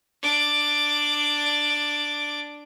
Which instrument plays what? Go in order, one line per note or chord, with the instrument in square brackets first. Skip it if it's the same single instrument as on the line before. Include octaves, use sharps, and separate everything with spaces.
[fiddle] D4 D6